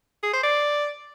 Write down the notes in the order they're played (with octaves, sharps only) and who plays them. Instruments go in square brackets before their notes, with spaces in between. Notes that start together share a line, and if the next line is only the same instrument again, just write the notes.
[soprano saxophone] G#4
C5
D5